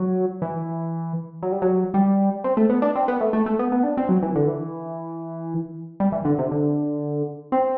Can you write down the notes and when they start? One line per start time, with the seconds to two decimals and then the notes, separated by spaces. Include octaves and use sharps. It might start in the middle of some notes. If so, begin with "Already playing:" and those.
Already playing: F#3
0.42 E3
1.43 F#3
1.52 G3
1.62 F#3
1.94 G3
2.44 C4
2.57 A3
2.69 B3
2.82 D4
2.95 C4
3.08 B3
3.21 A3
3.33 A3
3.46 A3
3.59 B3
3.72 B3
3.84 D4
3.97 C4
4.09 F#3
4.23 E3
4.36 D3
4.47 E3
6.00 G3
6.12 E3
6.25 D3
6.39 C3
6.51 D3
7.52 C4